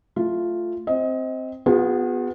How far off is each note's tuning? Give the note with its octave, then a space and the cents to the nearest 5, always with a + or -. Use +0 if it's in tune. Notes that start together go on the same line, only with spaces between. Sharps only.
A3 +0 F4 +0
C4 +0 D#5 +25
B3 +10 F4 +40 G#4 -25